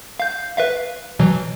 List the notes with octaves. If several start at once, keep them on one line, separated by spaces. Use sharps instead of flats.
F5 G6
B4 E5 F5
B2 E3 F#3